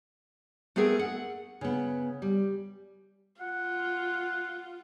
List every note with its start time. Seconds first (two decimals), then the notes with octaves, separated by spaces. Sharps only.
0.76 A3 B3 C4 G#4 A#4
0.99 F#5
1.61 C#3 B3
2.22 G3
3.41 F4 F#5